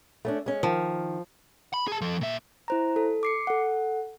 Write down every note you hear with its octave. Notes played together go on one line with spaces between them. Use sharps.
A3 C#4 D4
G#3 C#4
D#3 F3
B5
G#4 A5
F3 A4
A#2 E5
E4 C5 A#5
A4
D6 C7 C#7
A4 F#5